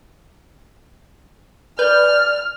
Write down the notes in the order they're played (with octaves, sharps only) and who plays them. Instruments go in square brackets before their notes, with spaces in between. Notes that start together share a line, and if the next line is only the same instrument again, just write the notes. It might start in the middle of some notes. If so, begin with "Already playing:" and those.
[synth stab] B4 G6 [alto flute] D5 [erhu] F6